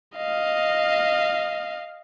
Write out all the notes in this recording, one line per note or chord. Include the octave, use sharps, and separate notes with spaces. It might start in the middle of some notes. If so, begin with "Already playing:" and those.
D#5 F5